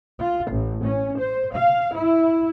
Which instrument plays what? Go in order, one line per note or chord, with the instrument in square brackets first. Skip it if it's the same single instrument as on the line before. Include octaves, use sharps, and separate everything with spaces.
[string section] F4
A1
C#4
C5
F5
E4